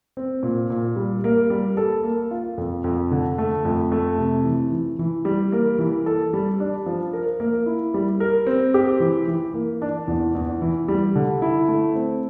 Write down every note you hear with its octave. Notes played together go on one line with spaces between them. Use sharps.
C4
A#2
A#2
G3
A#3
G3
A4
A#3
F4
F2
F2
D3
A3
F2
A3
C3
E3
E3
E3
G3
A#3
E3
A4
G3
D4
F3
A#4
A#3
E4
G3
A#4
C4
G4
E3
E3
A#3
D4
E2
E2
E3
G3
D3
E4
A3
C4